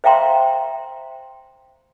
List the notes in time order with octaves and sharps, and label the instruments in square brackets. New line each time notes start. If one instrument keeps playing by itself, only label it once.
[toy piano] C5 E5 F5 G5 A#5 C6